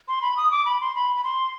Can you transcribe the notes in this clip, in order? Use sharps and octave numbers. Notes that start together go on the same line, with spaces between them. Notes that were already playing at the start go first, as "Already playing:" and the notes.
C6
B5
D#6
D6
B5
C6
B5
B5
C6